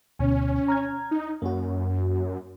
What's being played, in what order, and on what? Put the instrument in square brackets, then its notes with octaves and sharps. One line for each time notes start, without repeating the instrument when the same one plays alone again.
[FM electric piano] D2 B2 [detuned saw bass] C#4
[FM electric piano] A#5 F6 G#6
[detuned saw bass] D#4
[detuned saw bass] F#2 [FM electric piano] A#3 F#4